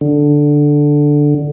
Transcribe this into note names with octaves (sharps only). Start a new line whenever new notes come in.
D3